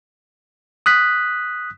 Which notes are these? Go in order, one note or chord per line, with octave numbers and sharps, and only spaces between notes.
D#6 F#6 B6